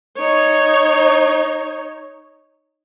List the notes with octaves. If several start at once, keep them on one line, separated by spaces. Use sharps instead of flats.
D#4 C#5